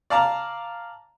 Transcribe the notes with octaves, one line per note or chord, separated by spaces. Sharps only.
D5 F5 A5 A#5